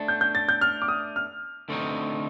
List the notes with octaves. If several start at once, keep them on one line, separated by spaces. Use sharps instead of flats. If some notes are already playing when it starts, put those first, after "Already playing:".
Already playing: A3 D4 A4
G6
G6
A6
G6
F6
D6
D#6
F6
D3 A3 C4 D#4